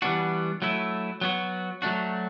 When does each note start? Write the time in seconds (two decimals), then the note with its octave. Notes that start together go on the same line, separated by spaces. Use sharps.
0.02 E3 G3 B3 D4 F#4
0.62 F#3 A3 E4
1.21 F#3 B3 F#4
1.82 F#3 A3 D4 F#4